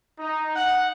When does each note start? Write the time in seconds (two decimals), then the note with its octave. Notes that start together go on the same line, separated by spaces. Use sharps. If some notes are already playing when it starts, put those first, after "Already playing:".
0.19 D#4
0.56 F#5